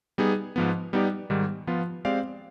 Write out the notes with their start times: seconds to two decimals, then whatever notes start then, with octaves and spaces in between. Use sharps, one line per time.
0.18 G3 B3 D#4 G#4
0.56 G#2 F3 B3
0.93 G3 B3 D#4 G4 D5
1.30 G#2 D#3 G3
1.67 F3 B3 F4
2.05 G#3 C4 G4 D5 F5